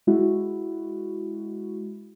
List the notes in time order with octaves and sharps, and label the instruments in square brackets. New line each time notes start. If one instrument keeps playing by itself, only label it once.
[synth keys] G#3 E4 F#4